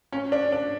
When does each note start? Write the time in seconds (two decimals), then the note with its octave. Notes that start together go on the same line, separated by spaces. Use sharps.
0.12 C#4
0.32 D4
0.52 D4